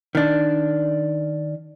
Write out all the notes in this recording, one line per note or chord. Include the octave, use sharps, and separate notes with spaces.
D#3 D4